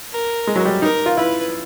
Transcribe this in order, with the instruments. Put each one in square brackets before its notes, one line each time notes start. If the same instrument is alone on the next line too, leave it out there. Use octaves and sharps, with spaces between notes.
[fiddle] A#4
[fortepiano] G#3
F#3
G3
[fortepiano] D#4 [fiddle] A#4
[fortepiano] F4
[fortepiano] E4 [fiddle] B4